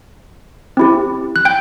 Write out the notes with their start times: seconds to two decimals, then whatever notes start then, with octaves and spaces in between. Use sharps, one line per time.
0.77 C4 E4 G4
1.36 F#6
1.45 G5 G6